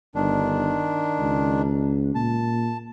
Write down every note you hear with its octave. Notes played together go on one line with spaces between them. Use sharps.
G1 D#3 D4
C#2
A#2 A5